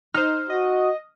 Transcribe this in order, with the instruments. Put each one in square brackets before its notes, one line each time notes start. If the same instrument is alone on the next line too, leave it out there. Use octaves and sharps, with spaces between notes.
[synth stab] D#4 C5 [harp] F6
[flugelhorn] F#4 [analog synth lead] D#5